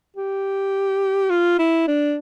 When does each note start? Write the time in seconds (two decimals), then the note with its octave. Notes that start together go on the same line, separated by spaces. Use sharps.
0.16 G4
1.30 F4
1.59 E4
1.87 D4